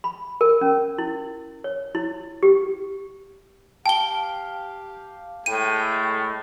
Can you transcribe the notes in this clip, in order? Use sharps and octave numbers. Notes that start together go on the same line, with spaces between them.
B5
A#4
C#4
E4
C#5
E4
G4
G4 F5 G5 A5 G7
A2 G#3 A3 G5 D#7